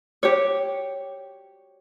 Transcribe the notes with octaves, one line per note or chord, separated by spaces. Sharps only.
G4 C#5